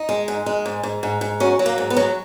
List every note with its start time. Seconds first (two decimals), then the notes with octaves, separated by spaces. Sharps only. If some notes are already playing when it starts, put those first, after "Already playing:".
Already playing: D#4
0.09 G#3
0.28 G#2
0.46 G#3
0.66 G#2
0.83 G#2
1.03 G#2
1.21 G#2
1.40 F#3 C#4
1.59 F#3
1.66 A#3
1.78 G#2
1.90 B3
1.97 F#3